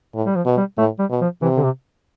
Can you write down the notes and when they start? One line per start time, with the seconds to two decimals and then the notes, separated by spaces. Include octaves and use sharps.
0.15 A2
0.26 G3
0.36 F3
0.46 B2
0.57 G3
0.78 A2 A3
0.99 G3
1.10 B2
1.21 F3
1.42 C3 E3
1.57 D3
1.63 C3